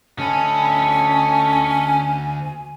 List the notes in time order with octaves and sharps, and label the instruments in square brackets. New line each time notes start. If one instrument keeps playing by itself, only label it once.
[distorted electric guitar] D2 B5 [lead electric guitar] C#4 [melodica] A4 D#5 [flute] G#5